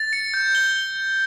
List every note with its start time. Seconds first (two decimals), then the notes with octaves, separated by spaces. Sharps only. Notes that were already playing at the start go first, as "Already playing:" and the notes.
Already playing: A6
0.13 C#7
0.34 G6
0.55 G7